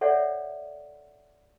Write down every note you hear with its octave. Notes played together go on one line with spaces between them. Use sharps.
A4 C#5 D5 E5 F#5